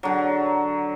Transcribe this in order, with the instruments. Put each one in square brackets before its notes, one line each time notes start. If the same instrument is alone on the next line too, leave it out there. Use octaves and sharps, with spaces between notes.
[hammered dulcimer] D3 F#3